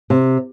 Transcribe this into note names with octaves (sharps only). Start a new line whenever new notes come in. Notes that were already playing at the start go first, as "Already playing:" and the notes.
C3